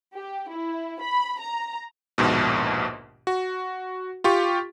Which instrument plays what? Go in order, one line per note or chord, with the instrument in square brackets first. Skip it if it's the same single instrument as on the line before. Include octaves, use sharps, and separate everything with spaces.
[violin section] G4
E4
B5
A#5
[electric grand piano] A#1 D#2 G#2 B2
F#4
F4 G4 C#6